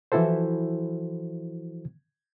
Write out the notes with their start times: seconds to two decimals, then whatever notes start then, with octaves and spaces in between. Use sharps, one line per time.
0.12 E3 F3 E4 F#4 A4 C5